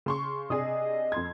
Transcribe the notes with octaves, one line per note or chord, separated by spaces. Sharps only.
C#3 C6 C#6
C3 D4 G#4 D#5
F2 C6 G#6